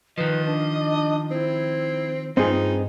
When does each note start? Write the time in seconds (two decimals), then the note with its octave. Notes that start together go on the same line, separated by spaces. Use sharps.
0.18 D#3 F3 B4 D#5
0.45 D4
1.31 C4 E4
2.37 G2 C4 D#4 F4 G#4